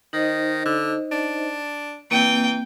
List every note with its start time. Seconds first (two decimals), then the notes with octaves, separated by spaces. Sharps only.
0.13 D#3 D#4 C5 D#5
0.65 D3
1.12 D4
2.11 E3 A#3 C4 G5